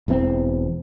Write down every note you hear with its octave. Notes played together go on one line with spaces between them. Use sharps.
E1 E2 D#3 C4